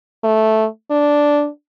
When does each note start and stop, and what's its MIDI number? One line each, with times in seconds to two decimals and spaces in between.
0.24 0.66 57
0.91 1.48 62